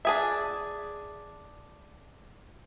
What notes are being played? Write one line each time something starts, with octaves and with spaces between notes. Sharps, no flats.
D4 G#4 E5